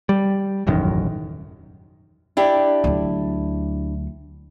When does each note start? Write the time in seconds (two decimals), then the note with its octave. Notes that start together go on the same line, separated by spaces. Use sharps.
0.09 G3
0.67 E1 A1 F#2 D#3
2.37 D4 E4 G4
2.84 D2 F#3